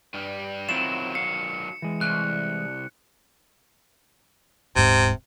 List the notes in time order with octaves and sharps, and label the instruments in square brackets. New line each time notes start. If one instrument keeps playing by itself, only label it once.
[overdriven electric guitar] G2 G3
[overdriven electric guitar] D#3 F#3 [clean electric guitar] C4 E4 F4 [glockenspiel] E7
[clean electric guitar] F5 [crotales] C#7
[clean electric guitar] E3 G#3
[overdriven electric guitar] C2 [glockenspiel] F#6
[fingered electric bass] D#1 G#2 [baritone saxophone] C3